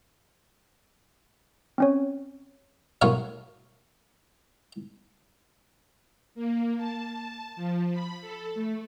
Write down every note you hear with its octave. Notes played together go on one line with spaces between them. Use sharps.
C4 C#4 C#5
B1 A2 B3 A#4 C#5 F5
A#3
A5
A5
F3
B5
A4
A3